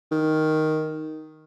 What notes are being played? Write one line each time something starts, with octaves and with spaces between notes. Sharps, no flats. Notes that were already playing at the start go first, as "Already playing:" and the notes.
D#3